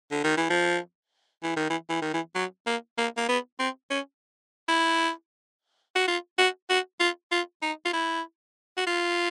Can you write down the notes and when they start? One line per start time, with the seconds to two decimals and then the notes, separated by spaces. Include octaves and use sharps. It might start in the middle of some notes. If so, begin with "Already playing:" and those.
0.12 D3
0.24 D#3
0.37 E3
0.50 F3
1.43 E3
1.57 D#3
1.70 E3
1.90 E3
2.02 D#3
2.14 E3
2.36 F#3
2.67 A#3
2.98 A#3
3.17 A#3
3.29 B3
3.60 C4
3.91 C#4
4.68 E4
5.96 F#4
6.08 F4
6.39 F#4
6.70 F#4
7.00 F4
7.32 F4
7.62 D#4
7.85 F4
7.93 E4
8.77 F#4
8.87 F4